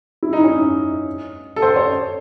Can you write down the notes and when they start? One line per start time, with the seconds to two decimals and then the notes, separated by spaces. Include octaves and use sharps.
0.23 E4
0.33 D#4
0.44 C#4
0.54 D#4
1.56 A4
1.62 C5
1.76 C#5